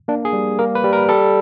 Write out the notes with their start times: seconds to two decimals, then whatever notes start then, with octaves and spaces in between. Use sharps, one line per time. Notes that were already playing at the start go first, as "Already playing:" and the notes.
0.08 A#3 D4
0.25 G#4
0.33 G3
0.59 A#3 A#4
0.75 B4
0.84 G3
0.93 A#4
1.09 G3 A4